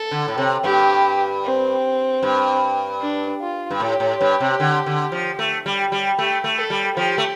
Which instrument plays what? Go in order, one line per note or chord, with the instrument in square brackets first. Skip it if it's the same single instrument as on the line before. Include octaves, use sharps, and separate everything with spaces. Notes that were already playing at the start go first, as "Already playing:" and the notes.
Already playing: [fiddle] A4
[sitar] D3
A2
C3
[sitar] G2 [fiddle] G4
[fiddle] C4
[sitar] G2
[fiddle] D4
F4
[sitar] G2
[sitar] A2 [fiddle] G4
[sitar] A2
G2
C3
D3
D3
F3
A3
G3
G3
[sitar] A3 [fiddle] G4
[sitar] A3
[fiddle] A4
[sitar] G3
[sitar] F3 [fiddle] G4
[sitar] A3